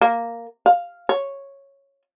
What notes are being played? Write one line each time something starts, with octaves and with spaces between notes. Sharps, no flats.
A#3
F5
C#5